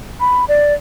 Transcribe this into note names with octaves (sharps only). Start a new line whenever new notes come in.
B5
D5